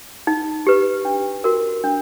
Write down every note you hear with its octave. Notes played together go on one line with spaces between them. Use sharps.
D#4
G4 B4
D4
F#4 A#4
D4